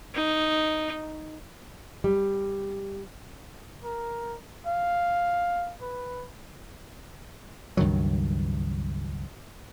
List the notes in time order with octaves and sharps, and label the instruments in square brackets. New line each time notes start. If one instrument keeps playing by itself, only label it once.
[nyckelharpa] D#4
[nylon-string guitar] G3
[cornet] A#4
F5
B4
[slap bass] C#2 G2 D#3 F#3